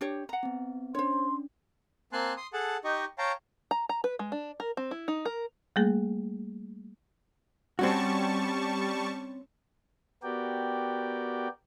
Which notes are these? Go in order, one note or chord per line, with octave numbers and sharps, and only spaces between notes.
D4 G4 C#5
F#5 A#5
B3 C4
C#4 D4 C5 C#5 C6
A#3 C4 G#5 A5 C6 F#6
C6 D#6
G#4 A4 F#5 A5
D#4 G4 D#5 C#6
C#5 F5 G5 A5 A#5
A#5
A#5
B4
G#3
D4
A#4
C4
E4
D#4
A#4
G3 A3 A#3 G#4
G3 C4 C#4 F#4 A5 C#6
B3 F#4 G4 A#4 D5 G5